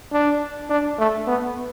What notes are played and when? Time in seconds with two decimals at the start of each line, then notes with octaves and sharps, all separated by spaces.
0.12 D4
0.70 D4
0.99 A3
1.28 B3